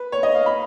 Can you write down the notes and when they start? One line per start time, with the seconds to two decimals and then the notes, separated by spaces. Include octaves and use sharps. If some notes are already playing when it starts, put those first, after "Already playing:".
Already playing: B4
0.12 C#5
0.23 D#5
0.35 F5
0.46 B5